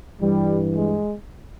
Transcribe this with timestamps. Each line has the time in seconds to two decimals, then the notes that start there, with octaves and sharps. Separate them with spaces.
0.21 G2 E3 G3
0.76 G#3